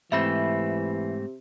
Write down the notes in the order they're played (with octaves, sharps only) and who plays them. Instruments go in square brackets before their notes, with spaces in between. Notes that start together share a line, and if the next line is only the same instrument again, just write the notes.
[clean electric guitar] G#2 A3 C4 [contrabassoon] C3 [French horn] E3 [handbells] E5 B5